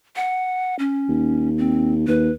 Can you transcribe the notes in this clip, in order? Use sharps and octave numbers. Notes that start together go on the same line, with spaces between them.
F#5
C#4
D#2
C4
D#2 B4